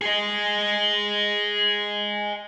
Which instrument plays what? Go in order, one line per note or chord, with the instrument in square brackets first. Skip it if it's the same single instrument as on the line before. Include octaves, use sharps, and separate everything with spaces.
[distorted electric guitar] G#4 D#5